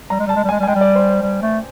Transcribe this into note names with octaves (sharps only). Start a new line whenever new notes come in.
G3 A#5
G#3
G3 A5
G#3
G3
G#5
G#3
G3
G#5
G#3 G5
G3
D5
C5
C5
G3
A3